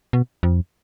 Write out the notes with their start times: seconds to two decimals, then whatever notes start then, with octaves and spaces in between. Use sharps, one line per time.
0.13 B2
0.43 F2